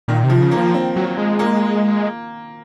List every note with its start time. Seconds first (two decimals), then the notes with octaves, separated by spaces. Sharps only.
0.08 A#2 D#3
0.24 C3
0.30 F3
0.41 C#3
0.51 A#3
0.57 F3
0.74 C4
0.96 F#3
1.18 G#3
1.39 A#3